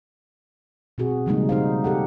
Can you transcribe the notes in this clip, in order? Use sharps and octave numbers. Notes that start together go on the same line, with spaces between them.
B2 C4 F#4 G#4
C#3 F3 G3 G#3 A#3 D#4
D#4 C5 F5
G4 A4 F#5